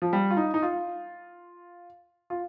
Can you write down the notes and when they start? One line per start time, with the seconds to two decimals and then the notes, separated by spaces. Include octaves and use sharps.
0.02 F3
0.13 G3
0.31 F4
0.37 D#4
0.54 D#4
0.62 F4
2.30 F4